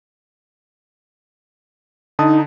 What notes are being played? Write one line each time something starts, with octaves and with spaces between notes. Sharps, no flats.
D3 D#4 A5 D#6